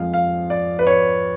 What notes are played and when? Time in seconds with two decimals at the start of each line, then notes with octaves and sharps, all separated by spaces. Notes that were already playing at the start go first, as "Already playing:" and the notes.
Already playing: F2 F3 G#3 F5
0.14 F5
0.50 D5
0.79 B4
0.87 C#5